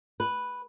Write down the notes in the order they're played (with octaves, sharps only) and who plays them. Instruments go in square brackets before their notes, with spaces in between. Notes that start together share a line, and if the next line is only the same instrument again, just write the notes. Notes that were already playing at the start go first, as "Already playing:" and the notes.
[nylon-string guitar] B4